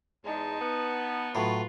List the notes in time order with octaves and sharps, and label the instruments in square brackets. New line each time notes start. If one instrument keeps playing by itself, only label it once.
[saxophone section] E2 G#3 [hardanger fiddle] D#4 A5
[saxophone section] B3
[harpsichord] A2 F#3 [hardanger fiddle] F4 B4